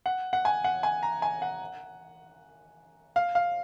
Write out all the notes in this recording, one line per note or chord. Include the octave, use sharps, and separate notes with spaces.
F#5
F#5
G#5
F#5
G#5
A#5
G#5
F#5
F5
F5